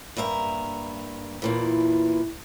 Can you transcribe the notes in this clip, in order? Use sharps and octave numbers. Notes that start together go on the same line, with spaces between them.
G2 A#3 E5 A#5
E2 A#2 E3